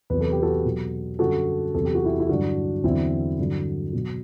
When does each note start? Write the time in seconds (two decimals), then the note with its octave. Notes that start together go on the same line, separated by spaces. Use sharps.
0.10 E2 C3 F#3 B4
0.21 A4
0.32 G4
0.43 F#4 A4
0.65 B2 F#3
1.19 F#2 D3 G3 F#4 A4
1.75 E2 C3 F#3 A4
1.85 G4
1.95 F#4
2.05 E4 G4
2.20 E4
2.29 G2 D3 F#3 D4 F#4
2.84 E2 D3 F#3 C4 E4
3.39 G2 D3 F#3
3.93 B2 F#3